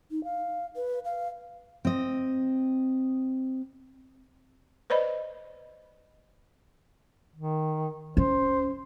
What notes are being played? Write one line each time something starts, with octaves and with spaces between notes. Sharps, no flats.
D#4
F5
B4
F5
C4 D#5
B4 C5 D5 D#5 B5
D#3
C#4 C5